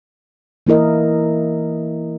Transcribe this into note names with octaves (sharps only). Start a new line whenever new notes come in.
E3 A#3 E4 A#4 D#5